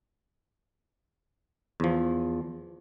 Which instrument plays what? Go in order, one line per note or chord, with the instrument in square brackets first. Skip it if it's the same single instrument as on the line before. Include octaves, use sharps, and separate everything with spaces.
[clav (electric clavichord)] E2 F3